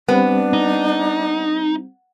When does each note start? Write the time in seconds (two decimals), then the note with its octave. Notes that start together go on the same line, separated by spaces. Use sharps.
0.08 G3 B3 C4 D4
0.53 D#4